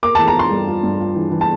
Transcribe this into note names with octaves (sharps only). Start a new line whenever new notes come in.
A#3 D6
E3 A5
A#5
F4 C6
G2
F4
G2
F4
E3
E3
A5